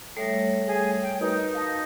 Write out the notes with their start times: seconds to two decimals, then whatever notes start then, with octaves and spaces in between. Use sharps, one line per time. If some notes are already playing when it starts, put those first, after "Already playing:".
0.16 G3 A3 A4 C#5 E5 A#6
0.67 G#4
1.02 G5
1.20 D#4 F#4 A#4 B4
1.54 F5 A5 A#6